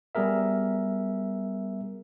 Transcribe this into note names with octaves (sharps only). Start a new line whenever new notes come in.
G3 B3 G#4 A#4 E5